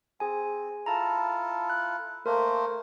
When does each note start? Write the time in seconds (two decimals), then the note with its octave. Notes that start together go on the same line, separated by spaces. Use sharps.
0.20 C4 G#4 G#5
0.86 E4 F4 A4 A5 A#5
1.70 F#6
2.26 A3 A#3 A#4 C5